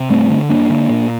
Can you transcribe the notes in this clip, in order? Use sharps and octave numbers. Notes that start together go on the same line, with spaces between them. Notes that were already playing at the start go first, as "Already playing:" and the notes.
Already playing: C3
G2 A3 C4
D3
G2 A#3 D4
D3
A#2